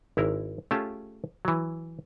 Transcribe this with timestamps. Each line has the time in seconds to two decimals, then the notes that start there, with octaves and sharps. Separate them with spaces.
0.17 G#1 E4 A#4
0.71 A3 C#4 F4 G4 G#4 A5
1.45 E3 F#3